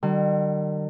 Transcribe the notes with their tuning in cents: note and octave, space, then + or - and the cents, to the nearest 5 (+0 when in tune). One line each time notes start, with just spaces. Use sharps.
D#3 -45 G3 -30